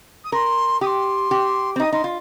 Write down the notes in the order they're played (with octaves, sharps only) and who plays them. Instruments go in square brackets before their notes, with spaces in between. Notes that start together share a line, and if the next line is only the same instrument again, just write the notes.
[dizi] D#6
[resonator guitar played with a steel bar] A#4 [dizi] C6
[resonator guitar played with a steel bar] G4 [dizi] D#6
[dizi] C6
[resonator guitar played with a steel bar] G4
C4
[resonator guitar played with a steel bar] D#4 [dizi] D#6
[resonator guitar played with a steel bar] D#4 [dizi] C6
[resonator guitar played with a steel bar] F4